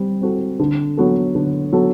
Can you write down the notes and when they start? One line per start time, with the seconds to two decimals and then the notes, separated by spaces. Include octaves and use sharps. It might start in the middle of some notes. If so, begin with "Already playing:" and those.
Already playing: G3 C4
0.21 C4 F#4 A4
0.60 D3
0.97 F#3 B3 F#4 A4
1.35 D3
1.73 F#3 B3 F#4 A4